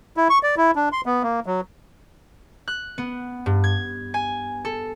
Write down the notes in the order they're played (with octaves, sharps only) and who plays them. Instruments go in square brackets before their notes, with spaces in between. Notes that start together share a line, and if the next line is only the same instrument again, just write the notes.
[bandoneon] E4
C#6
D5
E4
D4
C6
B3
A#3
F#3
[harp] F#6
B3
G2
G#6
G#5
A4